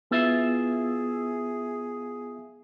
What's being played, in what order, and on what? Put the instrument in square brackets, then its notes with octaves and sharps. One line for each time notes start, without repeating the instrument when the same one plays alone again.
[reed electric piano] B3 [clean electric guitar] E4 F4 E5 [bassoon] G#4